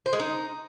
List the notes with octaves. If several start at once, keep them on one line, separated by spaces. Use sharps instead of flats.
C5
G#3
D#4